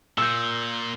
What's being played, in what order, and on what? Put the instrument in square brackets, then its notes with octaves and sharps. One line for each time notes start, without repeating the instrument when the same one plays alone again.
[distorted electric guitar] A#2 [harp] E6 G6